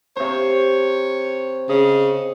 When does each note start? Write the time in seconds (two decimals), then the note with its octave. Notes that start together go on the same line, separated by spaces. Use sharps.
0.17 C3 C5 C#5
1.69 C#3 D#5